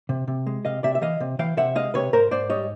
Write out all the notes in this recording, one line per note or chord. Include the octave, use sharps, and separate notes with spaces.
C3
C3
G#3
C3 D#5 F5
C3 D5 E5
E5
E3 D#5 F5
C3
E3 F5 G5
C3 E5 F#5
G#3 D#5 F5
C3 B4 C#5
G#2 A#4 C5
G#2 C5 D5
G3 C#5 D#5